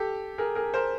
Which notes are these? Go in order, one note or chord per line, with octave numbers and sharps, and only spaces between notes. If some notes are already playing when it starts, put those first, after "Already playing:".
Already playing: G4 A4
G#4 A#4
G#4 A#4
A#4 C5